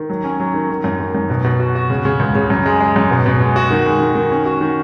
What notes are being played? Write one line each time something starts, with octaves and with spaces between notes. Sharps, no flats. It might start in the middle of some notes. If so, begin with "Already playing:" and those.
Already playing: D#3
F#3
C#4
F#3
D#3
D#3
F#2
D#3
F#2
B2
B2
F#4
F#4
C#3
C#3
C#2
C#3
F#2
G#3
G#3
F#2
B2
B2
G#3
F#4
D#3
G#3
D#3
D#3
C#4
F#4
D#3